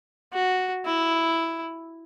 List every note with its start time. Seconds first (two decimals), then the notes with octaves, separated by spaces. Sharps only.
0.33 F#4
0.86 E4